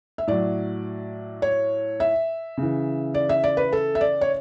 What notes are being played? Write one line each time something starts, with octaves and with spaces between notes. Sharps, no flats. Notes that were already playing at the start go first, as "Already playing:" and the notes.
E5
A2 F#3 D5
C#5
E5
C#3 E3
D5
E5
D5
B4
A4
E5
D5
C#5